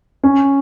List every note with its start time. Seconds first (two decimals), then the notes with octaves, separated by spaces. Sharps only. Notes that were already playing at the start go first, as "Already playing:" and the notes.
0.23 C#4